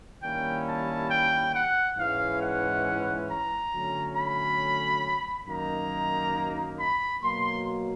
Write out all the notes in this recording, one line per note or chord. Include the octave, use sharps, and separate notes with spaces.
D#3 G3 A#3 C#4 E4 G5
A5
G5
F#5
G#2 E3 G#3 C#4 E4 F5
F#5
A#5
D3 F#3 A3 C#4
B5
F#2 D#3 F#3 A#3 D#4 A#5
B5
B2 F#3 A#3 C6